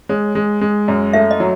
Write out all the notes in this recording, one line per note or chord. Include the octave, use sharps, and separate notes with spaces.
G#3 C#5
G#3
G#3
F#2
A3 E5
D#5
F#3